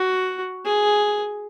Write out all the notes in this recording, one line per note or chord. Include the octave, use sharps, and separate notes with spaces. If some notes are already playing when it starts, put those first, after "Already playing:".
Already playing: F#4
G#4